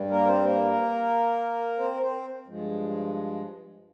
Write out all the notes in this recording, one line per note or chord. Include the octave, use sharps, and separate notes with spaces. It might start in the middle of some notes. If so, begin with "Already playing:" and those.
Already playing: G2 G3
A#3 A#4
C4 C5
A#3 A#4
C4 C5
A#4
C4 C5
G2 F3 G#3